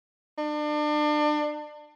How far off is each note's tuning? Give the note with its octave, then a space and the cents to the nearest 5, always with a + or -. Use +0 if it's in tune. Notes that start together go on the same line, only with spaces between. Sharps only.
D4 +30